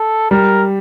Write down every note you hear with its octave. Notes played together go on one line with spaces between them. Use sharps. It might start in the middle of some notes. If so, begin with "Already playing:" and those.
Already playing: A4
G3 A#4